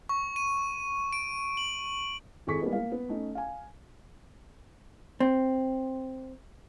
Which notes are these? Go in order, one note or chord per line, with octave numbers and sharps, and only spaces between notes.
C#6
D#7
D7
F#7
G#1 E4 G#4 A4 C#6 B6
G3 G#3 A#3 B3 D#4
A#3 F5
B3
A3 C#4 D#4
F5 G#5
C4